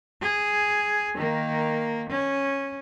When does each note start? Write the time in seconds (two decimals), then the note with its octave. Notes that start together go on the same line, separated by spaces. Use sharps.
0.22 G#4
1.16 D#3 A#3
2.10 C#4